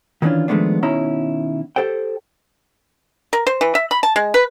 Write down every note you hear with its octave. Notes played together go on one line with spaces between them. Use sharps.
D#3 E3 G3 C#4 D4 F4
D#3 F3 G#3 A3 B3 D4
B2 D#3 C#4 E4 A#5
G4 A4 C5 G5
A#4
C5
E3
E5
B5
A5
G#3
B4